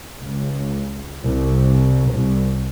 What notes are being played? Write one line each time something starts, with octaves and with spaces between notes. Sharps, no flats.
C#2
C2
C2